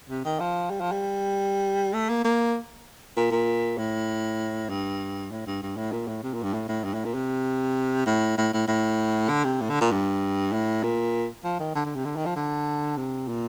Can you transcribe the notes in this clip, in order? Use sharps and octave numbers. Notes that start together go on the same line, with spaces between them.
C3
D#3
F3
G3
F3
G3
A3
A#3
A#3
A#2
A#2
A2
G2
A2
G2
G2
A2
A#2
A2
C3
A#2
G2
A2
A2
G2
A2
A#2
C3
A2
A2
A2
A2
D3
C3
A2
D3
A#2
G2
A2
A#2
F3
D#3
D3
D3
C3
D3
D#3
F3
D3
C3
A#2